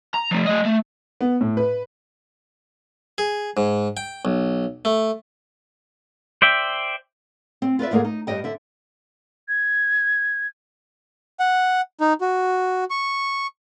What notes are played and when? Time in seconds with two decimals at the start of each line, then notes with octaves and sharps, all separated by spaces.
0.14 A#5
0.31 F3 A3
0.46 A3 D#5
0.65 A3
1.21 B3
1.41 A2
1.57 B4
3.18 G#4
3.57 G#2
3.97 G5
4.25 B1
4.85 A3
6.42 C5 D5 E5 G5
7.62 C4
7.79 F4 B4 D5 E5
7.91 D2 G#2 A3 A#3 G#4 A#4
8.04 D#4
8.27 G2 G3 D#5 G5
8.44 D3 E5
9.49 G#6
11.40 F#5
12.00 D#4
12.21 F#4
12.90 C#6